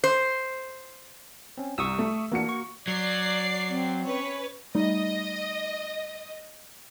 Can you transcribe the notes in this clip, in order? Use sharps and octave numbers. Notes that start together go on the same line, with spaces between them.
C5
C4 C#4
C2 C#6 D#6 E6
A3
E3 A#3 D4 F#4 C#7
C#6
F#3 D5 C7
C4
C#4 B4 C#5
G3 A3 D#4 D#5